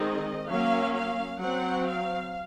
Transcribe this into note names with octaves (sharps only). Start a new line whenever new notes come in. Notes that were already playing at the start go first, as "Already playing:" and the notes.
Already playing: D#3 G#3 C4 D#5
F#3 A#3 C#4 F5
F5
F#3 C4 F#5
F5